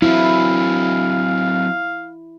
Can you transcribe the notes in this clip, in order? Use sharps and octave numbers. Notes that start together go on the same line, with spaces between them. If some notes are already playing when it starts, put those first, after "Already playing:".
F#3 C4 E4 F5